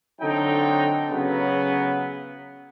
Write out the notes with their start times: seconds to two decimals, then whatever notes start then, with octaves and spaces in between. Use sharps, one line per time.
0.21 D3 F#3 C4 D#4 A4 G5
1.09 C#3 F#3 B3